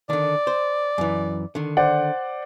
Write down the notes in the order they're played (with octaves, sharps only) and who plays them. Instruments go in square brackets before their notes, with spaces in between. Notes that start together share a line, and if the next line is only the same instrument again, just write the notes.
[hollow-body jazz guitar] D3 D#3 [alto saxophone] D5
[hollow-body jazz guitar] C5
F#2 E3
D3 D#3
[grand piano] C5 D5 F#5